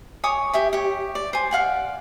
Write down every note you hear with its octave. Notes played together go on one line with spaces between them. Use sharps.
C#5 G#5 D6 D#6
G4 E5 G#5
G4 C#5
D5
C5 G#5
D5 F5 F#5 G#5